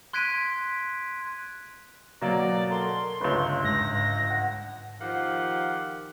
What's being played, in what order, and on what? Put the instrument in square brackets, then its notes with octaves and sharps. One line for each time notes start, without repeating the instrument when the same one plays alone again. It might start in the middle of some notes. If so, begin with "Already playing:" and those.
[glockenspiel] C6 F#6 G#6 B6 D7 D#7
[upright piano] B2 F#3 A#3 [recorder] D5 [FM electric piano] A#5
[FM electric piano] A4 A#4 [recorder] C6
[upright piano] G1 C#2 [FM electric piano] B4 C#5
[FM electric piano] G#2 [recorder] A#6
[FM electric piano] F#5
[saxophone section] D#3 F3 G4 F5 F#5